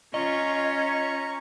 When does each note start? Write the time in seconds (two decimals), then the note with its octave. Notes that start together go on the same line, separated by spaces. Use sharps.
0.14 C#4 F4 D#5 A#5 C#6